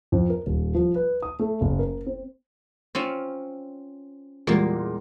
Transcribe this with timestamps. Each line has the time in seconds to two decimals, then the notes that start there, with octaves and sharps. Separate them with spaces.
0.12 F2
0.30 A#4
0.46 D#1
0.75 F3
0.95 B4
1.22 D#6
1.39 A3
1.61 F#1
1.79 A#4
2.06 C4
2.95 C4 C#4 F4
4.47 E2 A#2 G3 G#3 A#3